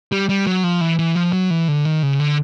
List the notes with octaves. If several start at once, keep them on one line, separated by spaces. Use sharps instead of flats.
G3
G3
F#3
F3
E3
E3
F3
F#3
E3
D3
D#3
C#3
D3